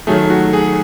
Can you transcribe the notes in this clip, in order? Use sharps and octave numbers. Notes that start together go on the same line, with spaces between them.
D#3 F#3 A3 G#4
F#4
G#4